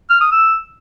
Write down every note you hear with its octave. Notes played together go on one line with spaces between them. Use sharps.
F6
D#6
E6